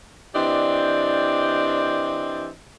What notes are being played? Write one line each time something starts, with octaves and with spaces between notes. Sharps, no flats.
E3 C4 D4 G4 D5 D#5